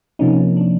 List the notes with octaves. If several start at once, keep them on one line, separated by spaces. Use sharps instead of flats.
C3 F3 A#3 C#4 D#4
D4